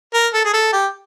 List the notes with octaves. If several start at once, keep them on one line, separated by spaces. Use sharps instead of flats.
A#4
A4
G#4
A4
G4